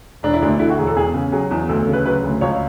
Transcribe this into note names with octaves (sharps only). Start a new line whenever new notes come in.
E1 D4
E4
D2 D4
D3 E4
F#4
E1 G#4
A4
E2 G#4
C#3
F#3 G#4
E2
D2 A4
A4
C#3
B4
F#3 B4
D2
C#2 C#5